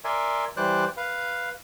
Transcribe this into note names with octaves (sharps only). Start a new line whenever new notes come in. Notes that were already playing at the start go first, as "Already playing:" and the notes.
A#4 D5 E5 G#5 C6
E3 G3 C5 D5 F#6
B4 F5